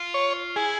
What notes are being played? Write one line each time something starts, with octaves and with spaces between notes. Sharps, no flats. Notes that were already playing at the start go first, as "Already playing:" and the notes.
Already playing: F4
C#5
E4 G#4